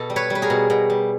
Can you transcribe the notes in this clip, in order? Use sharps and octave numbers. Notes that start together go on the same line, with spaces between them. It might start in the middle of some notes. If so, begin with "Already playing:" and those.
Already playing: B2 A4
G3
B4 C#5
G3
B4
G#4 A#4
B2
B2
G3